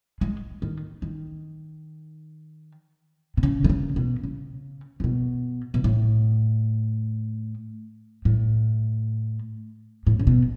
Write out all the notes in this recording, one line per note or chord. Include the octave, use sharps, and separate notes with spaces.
G#3
D#3
D#3
B2
C#3
D#3
C#3
B2
C#3
C#3
B2
B2
A2
A2
A2
C#3
B2